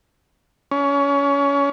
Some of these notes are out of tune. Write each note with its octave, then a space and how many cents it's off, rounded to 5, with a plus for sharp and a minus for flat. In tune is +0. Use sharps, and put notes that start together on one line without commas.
C#4 +25